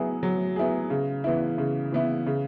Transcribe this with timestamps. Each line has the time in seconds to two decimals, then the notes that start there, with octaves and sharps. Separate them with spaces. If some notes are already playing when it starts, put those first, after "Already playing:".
Already playing: F#3 B3 E4 G#4
0.23 F#3
0.56 B3 E4 G#4
0.90 C#3
1.24 E3 B3 E4
1.58 C#3
1.92 E3 B3 E4
2.26 C#3